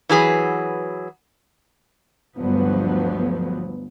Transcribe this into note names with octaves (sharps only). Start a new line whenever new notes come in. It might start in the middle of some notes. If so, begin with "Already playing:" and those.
E3 F#3 G#4 B4
G1 D2 G2 F3 F#3 B3